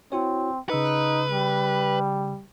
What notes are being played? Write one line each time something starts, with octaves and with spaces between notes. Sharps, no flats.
C4 E4 F#4 C#5
C#3 D#4 B4 E6 C#7
G3